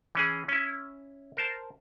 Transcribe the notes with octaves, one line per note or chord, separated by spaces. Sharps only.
E3 C#4 G#4
C#4 E4
A#4 C5 A5